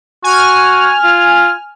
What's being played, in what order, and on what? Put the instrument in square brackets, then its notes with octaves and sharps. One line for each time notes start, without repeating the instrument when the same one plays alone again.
[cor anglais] F#4 [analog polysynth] G#5 F6
[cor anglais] F4